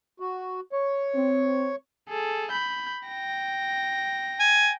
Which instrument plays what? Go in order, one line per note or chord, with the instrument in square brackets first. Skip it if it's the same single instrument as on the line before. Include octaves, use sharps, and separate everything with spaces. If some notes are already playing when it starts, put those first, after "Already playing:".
[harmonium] F#4
C#5
[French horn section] C4
[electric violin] G#4 A4
B5 G6
G5 A#6
[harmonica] G#5